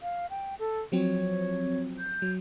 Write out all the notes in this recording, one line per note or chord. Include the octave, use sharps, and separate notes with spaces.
F5
G5
A4
F3 F#3 C4 C#5
G6
F#3